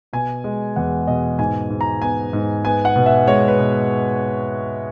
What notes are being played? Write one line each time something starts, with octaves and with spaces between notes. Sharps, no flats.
B2 G#5
G#3
E2 F#5
B2 D#5
G#2 G#5
G#2
A#5
B3 G#5
G#2
B3 G#5
F#5
B2
E5
G#3 C#5
B4
B2